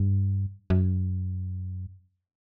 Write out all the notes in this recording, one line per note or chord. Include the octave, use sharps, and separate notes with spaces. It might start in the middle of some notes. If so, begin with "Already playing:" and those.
Already playing: G2
F#2